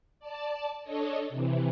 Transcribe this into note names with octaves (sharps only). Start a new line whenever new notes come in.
D5 A5
D4 A4 C#5 D#5
C3 E3